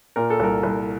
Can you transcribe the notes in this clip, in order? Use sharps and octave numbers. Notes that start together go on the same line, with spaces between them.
A#2 A#4
A4
C2 A#4
C2